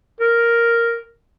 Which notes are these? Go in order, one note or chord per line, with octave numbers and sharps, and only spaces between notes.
A#4